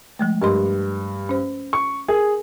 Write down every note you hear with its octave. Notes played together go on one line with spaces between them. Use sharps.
F3 G#3 A3
G2 A#4 D#5 C6
C#4 C5
C#6
G#4 A#4